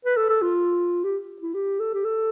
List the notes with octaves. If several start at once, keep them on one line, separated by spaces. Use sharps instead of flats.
B4
A4
A4
F4
G4
E4
G4
A4
G4
A4